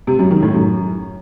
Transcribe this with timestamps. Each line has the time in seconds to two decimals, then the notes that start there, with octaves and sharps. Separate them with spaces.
0.07 C3
0.19 F#2
0.31 D#3
0.42 A2
0.54 F#2